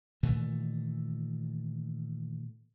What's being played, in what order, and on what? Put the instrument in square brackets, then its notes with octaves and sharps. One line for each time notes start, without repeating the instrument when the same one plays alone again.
[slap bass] A#2 D#3 E3 A3